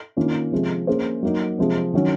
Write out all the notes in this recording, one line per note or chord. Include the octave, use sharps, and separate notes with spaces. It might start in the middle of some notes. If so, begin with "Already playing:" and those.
D#3 A#3 C#4 F4
C3 F3 G#3
A#3 C#4 G#4 C5
F#3 A#3 D#4
C3 F3 G#3
D#3 F#3 C#4